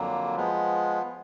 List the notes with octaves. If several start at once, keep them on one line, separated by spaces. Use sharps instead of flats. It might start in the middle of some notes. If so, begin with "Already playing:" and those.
Already playing: F2 D3 F#3 A#3
F3 G#3 B3